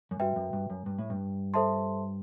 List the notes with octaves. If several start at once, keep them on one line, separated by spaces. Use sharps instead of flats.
F#2
G2 F#4 B4 E5 G5
F#2
G2
F#2
G2
A2
G2
A4 C5 E5 A5 C6